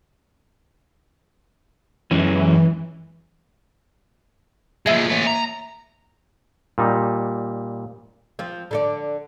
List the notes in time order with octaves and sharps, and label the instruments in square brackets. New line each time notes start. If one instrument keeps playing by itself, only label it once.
[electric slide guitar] F#2 G#3 C#4 [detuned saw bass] E3
[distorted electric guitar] F3 G#3 [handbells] A#3 E5 G#6
[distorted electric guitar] A3 C#4
A#5
[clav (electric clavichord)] A#2 G3 D#4
[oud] F3 C4
D3 A4 D5